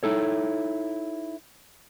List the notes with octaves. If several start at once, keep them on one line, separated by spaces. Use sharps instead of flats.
D#4 E4 A4 C#5